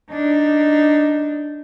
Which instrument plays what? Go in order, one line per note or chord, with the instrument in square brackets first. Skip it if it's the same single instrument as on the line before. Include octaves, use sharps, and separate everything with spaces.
[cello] D4 D#4